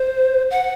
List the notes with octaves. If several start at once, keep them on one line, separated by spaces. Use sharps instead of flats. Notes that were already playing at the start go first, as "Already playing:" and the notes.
Already playing: C5
F#5